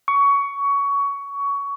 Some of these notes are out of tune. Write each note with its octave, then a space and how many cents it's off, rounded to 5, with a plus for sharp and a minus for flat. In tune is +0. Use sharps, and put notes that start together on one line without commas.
C#6 +20